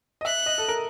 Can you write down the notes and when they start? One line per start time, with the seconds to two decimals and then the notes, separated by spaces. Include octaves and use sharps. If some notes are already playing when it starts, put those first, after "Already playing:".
0.21 D#5
0.25 E5 F#6
0.46 D#5
0.58 A4
0.68 A#4